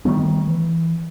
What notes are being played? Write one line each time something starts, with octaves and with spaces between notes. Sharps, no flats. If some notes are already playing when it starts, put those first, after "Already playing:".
D#3 G3 A3 B3
E3